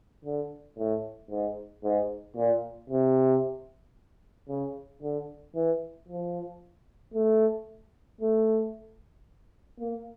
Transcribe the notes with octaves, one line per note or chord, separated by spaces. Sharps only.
D3
A2
G#2
G#2
A#2
C3
C#3
D3
E3
F3
A3
A3
A#3